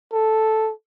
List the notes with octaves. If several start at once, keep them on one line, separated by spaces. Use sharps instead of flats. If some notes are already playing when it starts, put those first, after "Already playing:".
A4